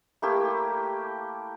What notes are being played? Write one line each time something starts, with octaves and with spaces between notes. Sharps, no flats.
A3 A#3 E4 G4